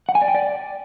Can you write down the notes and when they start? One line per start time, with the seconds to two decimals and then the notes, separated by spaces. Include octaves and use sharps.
0.09 F#5
0.15 G#5
0.22 D5
0.28 G5
0.35 D5